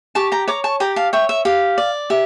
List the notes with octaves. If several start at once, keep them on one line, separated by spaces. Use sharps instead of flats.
G4 A5 C#6
G5 A#5
C#5 A#5 D6
A5 C#6
G4 G5 A#5
F5 A5
C#5 E5 G5
E5
G4 F5
D5
G4 E5